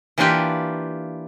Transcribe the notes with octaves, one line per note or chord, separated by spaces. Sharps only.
E3 A#3 D4 F4 G4 B4